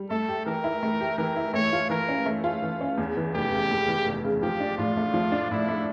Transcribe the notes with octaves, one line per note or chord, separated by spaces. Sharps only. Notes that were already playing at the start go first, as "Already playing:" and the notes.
Already playing: G3
A3 A4
G4
E3 A#4
E4
A3
G4
E3 A#4
E4
A3 C#5
F4
E3 A#4
C#4
A3
F4
E3
C#4
E2
E3
F1 G4
C#3
E2
E3
F1
C#3
F3 G4
D4
A2 F4
A3
F3
D4
A2 E4
A3